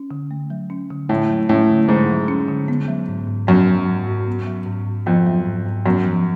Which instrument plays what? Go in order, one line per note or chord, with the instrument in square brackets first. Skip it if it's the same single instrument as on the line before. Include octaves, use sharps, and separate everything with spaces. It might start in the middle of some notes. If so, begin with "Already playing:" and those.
Already playing: [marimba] C#4
D3
A3
F#3
C#4
D3
[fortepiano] A2 [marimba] A3
[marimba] F#3
[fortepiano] A2 [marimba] C#4
[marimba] D3
[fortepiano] G#2 [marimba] A3
[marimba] F#3
C#4
D3
B3
F#3
G#2
G#2
[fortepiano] F#2 [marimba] B3
[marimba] F#3
G#2
G#2
B3
F#3
G#2
G#2
[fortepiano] F2 [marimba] B3
[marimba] F#3
G#2
G#2
[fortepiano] F#2 [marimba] B3
[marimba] F3